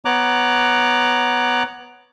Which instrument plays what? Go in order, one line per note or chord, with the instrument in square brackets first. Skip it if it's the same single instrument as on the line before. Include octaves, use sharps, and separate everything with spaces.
[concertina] B3 C#5 A#5 D6 F#6